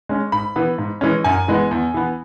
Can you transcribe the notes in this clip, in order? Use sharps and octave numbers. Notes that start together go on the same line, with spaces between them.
G#3 C#4
G#2 B5
E3 B3
G#2
E3 G#3 C#4
F#2 G#5
E3 G#3 B3
E2
E3 B3